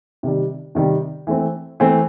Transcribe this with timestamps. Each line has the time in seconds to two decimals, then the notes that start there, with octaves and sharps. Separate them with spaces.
0.23 C3 D#3 G3
0.75 C3 D#3 G3
1.27 E3 A3 C4
1.80 E3 A3 C4